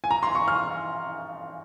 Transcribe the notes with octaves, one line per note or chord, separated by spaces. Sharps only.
G#5
A#5
C6
C#6
F6